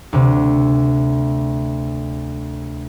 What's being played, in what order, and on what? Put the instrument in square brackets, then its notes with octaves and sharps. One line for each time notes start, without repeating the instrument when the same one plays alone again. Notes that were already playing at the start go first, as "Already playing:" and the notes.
[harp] D2 C3